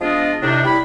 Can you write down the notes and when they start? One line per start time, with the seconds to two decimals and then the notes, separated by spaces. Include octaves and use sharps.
0.01 F3 G#3 B3 D4 F4 D#5
0.41 A2 C3 D4 D#4
0.65 G3 E4 B5